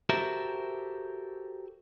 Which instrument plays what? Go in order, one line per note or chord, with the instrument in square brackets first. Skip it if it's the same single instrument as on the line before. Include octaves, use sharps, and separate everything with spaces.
[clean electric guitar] F#4 G4 A4 A#4 C5 E5